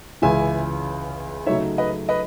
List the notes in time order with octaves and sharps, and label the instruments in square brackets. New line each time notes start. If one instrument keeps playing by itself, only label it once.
[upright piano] C#2 C#3 E3 [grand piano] E5 G#5
[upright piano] C#3 F#3 A3 D#4 [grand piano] C#5 E5
[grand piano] B4 D#5
B4 D#5